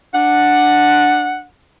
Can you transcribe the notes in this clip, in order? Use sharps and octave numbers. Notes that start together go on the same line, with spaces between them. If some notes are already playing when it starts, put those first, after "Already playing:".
D4 F#5